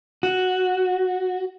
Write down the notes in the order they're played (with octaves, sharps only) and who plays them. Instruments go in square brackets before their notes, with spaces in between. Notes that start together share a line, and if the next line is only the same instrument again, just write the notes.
[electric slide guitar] F#4